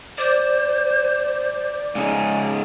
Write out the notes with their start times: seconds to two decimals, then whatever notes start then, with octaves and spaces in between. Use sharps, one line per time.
0.18 C5 D5
1.95 G#2 C#3 D#4 G#5